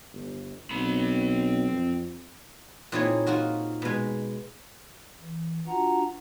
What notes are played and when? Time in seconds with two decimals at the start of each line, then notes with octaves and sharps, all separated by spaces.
0.13 G1
0.71 B1 C4 B5
1.72 F2
2.92 A#2 C4 D#4 E4 G#4 C#5
3.26 D#4 F4 F#4 A#4
3.82 B2 G#3
5.20 E3
5.67 D4 F4 F#4 F#5 A#5